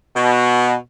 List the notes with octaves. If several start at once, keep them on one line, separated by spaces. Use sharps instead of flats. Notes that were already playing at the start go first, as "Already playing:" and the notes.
B2